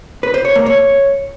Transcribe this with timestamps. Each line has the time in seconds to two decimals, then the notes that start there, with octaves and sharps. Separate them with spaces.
0.23 B4
0.34 C5
0.45 C#5
0.55 A#3
0.66 C#5